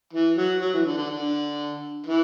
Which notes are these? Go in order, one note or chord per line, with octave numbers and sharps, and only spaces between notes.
E3
F#3
F#3
E3
D3
D3
D3
E3